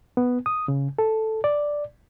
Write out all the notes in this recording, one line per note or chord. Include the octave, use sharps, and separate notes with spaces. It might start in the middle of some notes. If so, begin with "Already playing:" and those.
B3
D#6
C#3
A4
D5